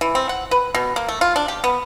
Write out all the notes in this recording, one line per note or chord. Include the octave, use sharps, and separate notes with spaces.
E3
C4
F#5
B4
B2
A#3
A3
F4
D4
G4
B3